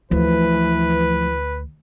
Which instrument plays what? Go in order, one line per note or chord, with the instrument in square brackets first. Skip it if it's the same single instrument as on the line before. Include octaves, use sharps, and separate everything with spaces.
[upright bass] D2 [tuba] E3 [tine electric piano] F3 A3 [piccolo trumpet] B4